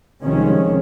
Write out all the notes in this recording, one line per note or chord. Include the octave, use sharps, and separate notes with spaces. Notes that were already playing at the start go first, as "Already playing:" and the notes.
C2 C3 D#3 F3 G#3 C#4